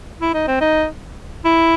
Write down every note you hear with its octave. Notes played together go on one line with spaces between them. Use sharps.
E4
D#4
C4
D#4
E4